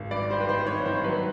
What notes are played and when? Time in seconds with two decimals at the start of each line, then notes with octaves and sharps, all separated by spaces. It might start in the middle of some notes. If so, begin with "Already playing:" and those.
Already playing: G#1
0.11 G2 D5
0.30 G3 C5
0.40 B4
0.49 D#3 C5
0.67 G2 C#5
0.85 D#3 C5
1.04 F#3 B4